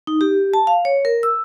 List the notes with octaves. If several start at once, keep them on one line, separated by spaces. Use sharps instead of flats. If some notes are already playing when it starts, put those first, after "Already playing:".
D#4
G4
A5
F5
C#5
A#4
E6